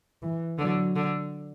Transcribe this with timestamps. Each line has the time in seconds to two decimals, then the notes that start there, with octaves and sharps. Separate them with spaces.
0.22 E3
0.58 D3 F#3
0.96 D3